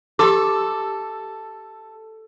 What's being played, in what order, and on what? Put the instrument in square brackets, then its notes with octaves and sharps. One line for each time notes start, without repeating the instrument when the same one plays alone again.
[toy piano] G4 C6 D6 [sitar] A4